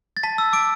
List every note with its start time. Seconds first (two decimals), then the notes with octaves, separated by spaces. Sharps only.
0.17 A6
0.23 A5 B6
0.38 E6
0.53 D6 E6 D7